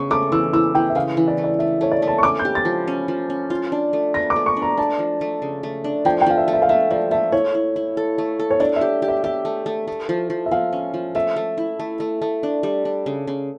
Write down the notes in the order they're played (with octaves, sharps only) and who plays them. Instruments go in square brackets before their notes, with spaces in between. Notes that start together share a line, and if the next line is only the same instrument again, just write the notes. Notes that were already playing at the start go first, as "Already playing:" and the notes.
Already playing: [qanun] C#3 [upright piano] C#6
[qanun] A3 [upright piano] D6
[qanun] E3 [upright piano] E6
[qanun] E3 [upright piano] E6
[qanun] E3 [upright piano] G5
[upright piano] E5
[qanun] C#3 [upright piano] F5
[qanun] E3
[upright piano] D5
[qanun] A3
[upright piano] D5
[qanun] A3 [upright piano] E5
[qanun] A3 [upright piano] C#5
[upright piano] D5
[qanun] A3
[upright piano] A5
C#6
[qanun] C#4 [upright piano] D6
[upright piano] G6
[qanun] G4
[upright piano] A6
[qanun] F3
C#4
F3
C#4
F4
D4
A3
[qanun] A3 [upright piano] A#6
[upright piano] D6
[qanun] A3
[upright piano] C#6
[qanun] D4
[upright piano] A#5
[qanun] D4 [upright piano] A5
[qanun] F3
A3
C#3
A3
D4
[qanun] F3 [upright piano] G5
[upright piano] G5
[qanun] F3 [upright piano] F5
[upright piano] E5
[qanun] A3
[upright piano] E5
F5
[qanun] A3 [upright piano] E5
[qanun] F3 [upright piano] D5
[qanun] A3 [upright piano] E5
[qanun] E4 [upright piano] C#5
[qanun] E4
E4
A4
A3
A4
[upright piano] C#5
[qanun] D4 [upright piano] D5
[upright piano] E5
[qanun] G4
G4
[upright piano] E5
[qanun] G4 [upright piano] E5
[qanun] A3
A3
A3
F3
F3
[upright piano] E5
[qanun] F3 [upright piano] F5
[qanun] C#4
F3
[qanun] A3 [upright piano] E5
[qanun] A3
E4
A3
A3
A3
D4
G3
D4
C#3
C#3